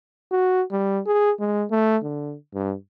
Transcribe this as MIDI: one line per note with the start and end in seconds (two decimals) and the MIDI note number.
0.31 0.63 66
0.71 1.00 55
1.07 1.31 68
1.40 1.65 56
1.71 1.97 57
2.03 2.35 50
2.54 2.74 43